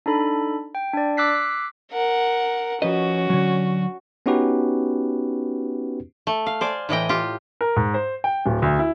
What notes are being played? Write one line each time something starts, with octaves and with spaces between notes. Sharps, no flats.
D4 D#4 A4 B5
G5
D4 D5
D6 E6 F#6 B6 C7
A#4 F#5
F3 C#4 F#4 B4 D#5
D3 F#3
B3 C#4 D#4 F#4 G4 B4
A3
F5
C5 D5 G#5
A2 E3 D#5 G5
F4 G4
A#4
G#2
C5
G5
D1
D2
E4